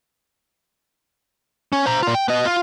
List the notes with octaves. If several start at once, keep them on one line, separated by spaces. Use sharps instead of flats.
C#4
C5 A#5
A#2 F4
G5
B3 D#5
F4